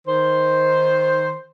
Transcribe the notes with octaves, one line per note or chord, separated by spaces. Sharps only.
D#3 C5